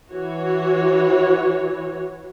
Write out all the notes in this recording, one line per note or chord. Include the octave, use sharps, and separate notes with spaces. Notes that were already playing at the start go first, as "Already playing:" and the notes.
E3 F#4 C#5